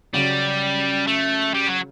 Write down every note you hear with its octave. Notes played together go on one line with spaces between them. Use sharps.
C#3 F#3 G3 C#4 F#4
A3
G3
F#3